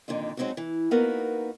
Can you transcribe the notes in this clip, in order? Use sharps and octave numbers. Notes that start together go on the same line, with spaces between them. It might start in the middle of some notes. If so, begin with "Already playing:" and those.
F2 A#2 D3 D#3
F#3 G#3 C4 C#4 D#4 F#4
E3
A#3 B3 D#4 F#4 A#4 B4